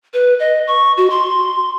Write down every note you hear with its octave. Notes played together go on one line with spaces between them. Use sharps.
B4
D#5
C#6
F#4
C6